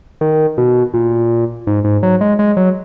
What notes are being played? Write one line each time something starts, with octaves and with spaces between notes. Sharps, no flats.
D#3
B2
A#2
G#2
G#2
F#3
G#3
G#3
F#3